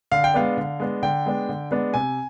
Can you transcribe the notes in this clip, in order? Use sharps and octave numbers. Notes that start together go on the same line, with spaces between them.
D3 F5
G5
G#3 B3 D4 F5
D3
G#3 B3 D4
D3 G5
G#3 B3 D4
D3
G#3 B3 D4
C3 G#5